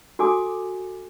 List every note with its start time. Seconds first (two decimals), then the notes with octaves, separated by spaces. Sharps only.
0.19 F#4 A4 G#5 D6